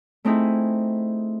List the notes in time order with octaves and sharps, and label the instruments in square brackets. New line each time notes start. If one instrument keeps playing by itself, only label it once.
[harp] A3 C4 D#4 E4 G#4